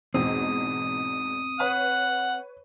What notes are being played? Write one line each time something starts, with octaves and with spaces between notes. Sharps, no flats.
E2 G#2 B2 C4 D#6
B4 C#5 F#5